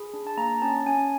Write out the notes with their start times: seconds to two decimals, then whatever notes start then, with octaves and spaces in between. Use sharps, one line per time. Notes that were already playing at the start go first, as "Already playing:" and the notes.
Already playing: G#4 B5
0.14 D4
0.27 A5
0.37 A#3 A#5
0.62 C#4 A5
0.86 C#4 G#5